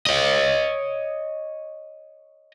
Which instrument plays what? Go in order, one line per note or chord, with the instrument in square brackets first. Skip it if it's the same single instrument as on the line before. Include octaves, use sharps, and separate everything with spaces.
[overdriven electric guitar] C#5 D#5